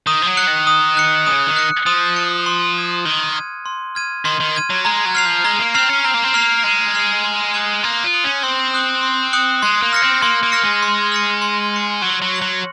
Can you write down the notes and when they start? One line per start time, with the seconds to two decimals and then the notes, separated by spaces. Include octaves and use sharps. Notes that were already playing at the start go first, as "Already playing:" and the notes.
0.07 D#3 D#6
0.22 F3
0.26 F#3
0.37 F#6 C#7
0.47 D#3
0.67 D#6
0.97 F#6 C#7
1.26 C#3 D#6
1.47 D#3
1.56 F#6 C#7
1.86 F3 D#6
2.16 F#6 C#7
2.46 C6
2.76 F6 G#6 D#7
3.05 D#3 C6
3.35 F6 G#6 D#7
3.66 C6
3.95 F6 G#6 D#7
4.25 D#3 C6
4.40 D#3
4.55 F6 G#6 D#7
4.70 F#3
4.85 G#3 A#5
5.05 F#3
5.15 F6 C7 F7
5.25 F3
5.44 G#3 A#5
5.59 A#3
5.74 C4 F6 C7 F7
5.89 C#4
6.04 C4 A#5
6.14 A#3
6.24 C4
6.34 A#3 F6 C7 F7
6.64 G#3 A#5
6.95 F6 C7 F7
7.24 C6
7.54 D#6 F#6 C#7 F#7
7.83 A#3 C6
8.04 F4
8.13 D#6 F#6 C#7 F#7
8.24 C#4
8.43 C4 C6
8.73 D#6 F#6 C#7 F#7
9.03 C6
9.33 D#6 F#6 C#7 F#7
9.62 G#3 C6
9.82 A#3
9.93 F6 A#6 C#7
10.02 C4
10.22 A#3 C6
10.43 A#3
10.52 F6 A#6 C#7
10.63 G#3
10.83 C6
11.12 F6 A#6 C#7
11.42 C6
11.72 F6 A#6 C#7
12.01 F#3 C#6
12.22 F#3
12.31 F#6 A#6 C#7 F#7
12.42 F#3